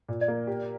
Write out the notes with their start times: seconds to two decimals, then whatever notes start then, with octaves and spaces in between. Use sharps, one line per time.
0.08 A#2
0.21 D5
0.28 A#3
0.47 G4